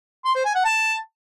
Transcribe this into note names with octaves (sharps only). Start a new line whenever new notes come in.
C6
C5
G#5
F#5
A5